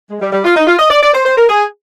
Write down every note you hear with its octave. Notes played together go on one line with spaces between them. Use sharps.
G#3
G3
G3
F4
D#4
F4
D#5
D5
D5
C5
C5
A#4
G#4